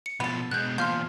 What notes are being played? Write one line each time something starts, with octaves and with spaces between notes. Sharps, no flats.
C#7
B2 F3 B3 A4
B2 G#3 F#6 G6
E2 A#2 F3 C6 F6 G6